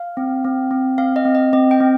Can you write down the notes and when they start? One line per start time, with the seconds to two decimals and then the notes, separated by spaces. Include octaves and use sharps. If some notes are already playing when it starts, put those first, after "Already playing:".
Already playing: F5
0.17 C4
0.44 C4
0.71 C4
0.98 C4 F5
1.16 D#5
1.25 C4
1.35 D#5
1.53 C4 D#5
1.71 G5
1.81 C4